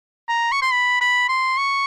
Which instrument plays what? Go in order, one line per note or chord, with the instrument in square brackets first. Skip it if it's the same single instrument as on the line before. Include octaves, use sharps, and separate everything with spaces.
[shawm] A#5
C#6
C6
B5
B5
C6
C#6